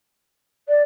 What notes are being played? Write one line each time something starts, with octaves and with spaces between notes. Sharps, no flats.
D5